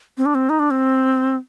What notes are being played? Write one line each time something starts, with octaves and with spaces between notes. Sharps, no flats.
C4
D4
C4
D#4
D4
C4